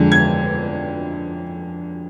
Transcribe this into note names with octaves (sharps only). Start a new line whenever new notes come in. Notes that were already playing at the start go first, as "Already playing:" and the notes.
Already playing: F2 D3 G#3 D4
G#6